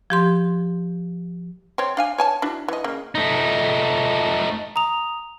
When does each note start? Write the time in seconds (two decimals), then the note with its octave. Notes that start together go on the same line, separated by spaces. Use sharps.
0.10 F3 G4 C6
1.78 C4 C#5
1.97 D4 F5 G#5
2.18 C#5 G#5 A5
2.42 D4 E4 F#4
2.68 E3 D#5
2.84 C#3 A#3
3.15 A3 D#4
4.76 A#5 D#6 F7